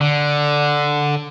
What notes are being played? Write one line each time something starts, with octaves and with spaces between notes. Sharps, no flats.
D3